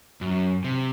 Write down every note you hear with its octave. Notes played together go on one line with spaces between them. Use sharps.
F#2
C3